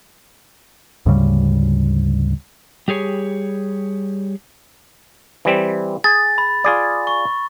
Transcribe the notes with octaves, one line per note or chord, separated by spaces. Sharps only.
D2 G#2 C#3 G3
G3 G4 G#4 C#5
E3 G3 C4
G#4 A6
B5
F4 G#4 D5
C#6